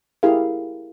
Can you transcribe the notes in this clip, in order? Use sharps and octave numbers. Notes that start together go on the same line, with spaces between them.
E4 G4 G#4 A#4 F5